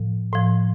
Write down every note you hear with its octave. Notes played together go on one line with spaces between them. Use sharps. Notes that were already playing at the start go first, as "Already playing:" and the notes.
Already playing: A2 F3
A2 F3